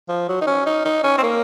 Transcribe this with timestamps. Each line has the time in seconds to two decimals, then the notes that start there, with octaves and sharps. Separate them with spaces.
0.09 F3
0.29 F#3
0.41 D#4
0.47 C#4
0.66 D#4
0.85 D#4
1.04 C#4
1.18 C4
1.23 A#3